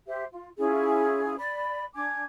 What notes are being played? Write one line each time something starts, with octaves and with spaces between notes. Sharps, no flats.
G4 C5 E5
F4
C#4 E4 F4 G#4
D5 B5
D4 G#5 D6 G#6